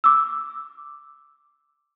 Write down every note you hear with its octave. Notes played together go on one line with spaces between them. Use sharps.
D6 E6